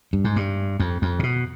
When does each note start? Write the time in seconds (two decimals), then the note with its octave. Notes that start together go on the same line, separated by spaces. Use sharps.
0.13 G2
0.24 G#2
0.36 G2
0.80 F2
1.02 F2
1.19 C3
1.23 B2